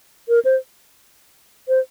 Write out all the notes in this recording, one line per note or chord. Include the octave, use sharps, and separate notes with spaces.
A#4
C5
C5